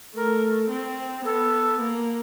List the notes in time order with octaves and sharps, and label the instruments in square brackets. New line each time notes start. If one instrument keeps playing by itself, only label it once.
[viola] A3 [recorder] A#4
[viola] C4
[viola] B3 [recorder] A4
[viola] A#3